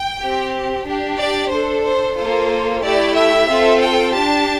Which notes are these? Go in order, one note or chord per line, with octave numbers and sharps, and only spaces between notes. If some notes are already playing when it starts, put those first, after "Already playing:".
Already playing: G5
C4 G4
D4 G4
D5
D4 A4 C5
C5
A#3 F4 A4 C5
A3 E4 G4 D5
E5
C4 F4 A4
G5
D4 G4 A5